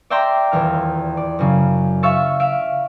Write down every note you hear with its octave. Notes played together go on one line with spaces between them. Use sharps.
D5 E5 G5 A#5 C6 D6
D#1 E2 F6
D5
F#2 C#3
E5 F5 C#6 E6 A6
E5 F5 D7